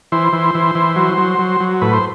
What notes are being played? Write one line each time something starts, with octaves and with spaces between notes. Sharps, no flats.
E3 C5
E3
E3
E3
F#3
F#3
F#3
F#3
A2 B4
C5